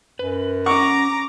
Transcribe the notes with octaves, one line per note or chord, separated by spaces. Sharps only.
F#2 B4
C#4 F#5 A#5 C#6 D6